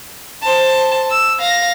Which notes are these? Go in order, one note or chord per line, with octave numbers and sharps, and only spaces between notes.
C5 A5
E6
F5 A#6